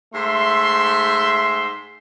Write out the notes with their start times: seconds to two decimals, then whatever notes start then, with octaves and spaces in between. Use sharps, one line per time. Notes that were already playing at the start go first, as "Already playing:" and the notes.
0.14 G#2 A3 E5 C6